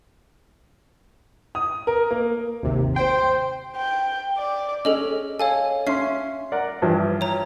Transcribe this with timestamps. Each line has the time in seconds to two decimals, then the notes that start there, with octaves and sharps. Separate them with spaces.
1.55 D#6
1.87 A#4
2.11 A#3
2.63 G#1 D#2 C3
2.96 C5 G5
3.77 G5
4.38 D5
4.85 C#4 G#4 A4 D#5
5.39 A4 C#5 F5 G#5
5.87 C#4 E5 C6 C7
6.52 A#4 D5 F#5
6.82 G2 E3 F3
7.21 C#5 A#5